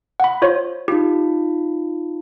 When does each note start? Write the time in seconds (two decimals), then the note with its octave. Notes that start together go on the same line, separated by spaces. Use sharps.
0.20 F#5 B5
0.42 F4 C5 C#5
0.88 D#4 F4 G4